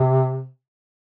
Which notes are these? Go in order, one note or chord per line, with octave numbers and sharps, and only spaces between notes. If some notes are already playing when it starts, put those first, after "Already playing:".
Already playing: C3